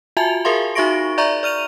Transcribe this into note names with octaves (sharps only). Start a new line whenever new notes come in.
F4 F#4 E5 G#5 A5 F7
G#4 A#4 E5 F5 C6
D#4 F#4 E5 C#6 A#6 D7
D5 E5 A#5 C#6
D5 F6 D#7 F7